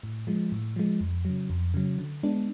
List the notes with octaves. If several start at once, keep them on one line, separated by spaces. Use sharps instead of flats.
A2
F3 G#3
A2
F3 G#3
F2
C#3 F#3
F2
C#3 F#3
D3
G#3 B3 D4